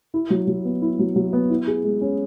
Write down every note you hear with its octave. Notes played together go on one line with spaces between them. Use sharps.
E4
F#3
F#3
B3
E4
F#3
F#3
B3
E4
G#4
G#3
C#4